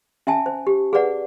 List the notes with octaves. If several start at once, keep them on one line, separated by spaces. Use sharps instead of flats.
C#4 E5 G#5 A5
C5
G4
G#4 B4 D5 F#5